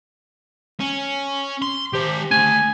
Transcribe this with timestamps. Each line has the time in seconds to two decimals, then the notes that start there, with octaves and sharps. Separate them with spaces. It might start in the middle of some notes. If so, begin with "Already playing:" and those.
0.80 C#4
1.62 C6
1.93 D#3 G4 C5
2.31 A3 D4 G#5